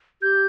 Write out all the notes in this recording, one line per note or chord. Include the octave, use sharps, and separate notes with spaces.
G4 G6